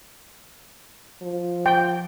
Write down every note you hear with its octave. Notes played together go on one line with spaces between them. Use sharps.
F3
G5